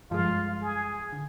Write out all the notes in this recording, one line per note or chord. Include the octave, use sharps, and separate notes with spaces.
G2 F3 G#3 F4
G#4
D3